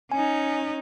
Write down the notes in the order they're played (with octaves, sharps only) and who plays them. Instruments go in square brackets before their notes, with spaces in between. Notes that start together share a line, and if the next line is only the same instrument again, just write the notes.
[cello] C#4 D#4 [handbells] G#5